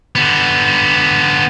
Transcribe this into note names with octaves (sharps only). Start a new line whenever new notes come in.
D3 B3